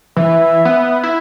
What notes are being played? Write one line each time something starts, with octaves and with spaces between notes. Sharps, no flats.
E3 E5
B3
E4